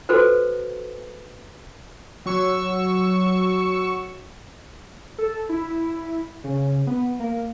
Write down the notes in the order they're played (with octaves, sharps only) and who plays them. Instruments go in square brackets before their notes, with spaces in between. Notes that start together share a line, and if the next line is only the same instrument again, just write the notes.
[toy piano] F#4 A4 B4 C5
[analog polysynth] F#3 C#6 E6
[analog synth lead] A4
E4
C#3
B3
A#3